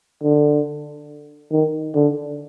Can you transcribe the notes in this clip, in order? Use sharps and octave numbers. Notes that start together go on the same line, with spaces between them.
D3
D#3
D3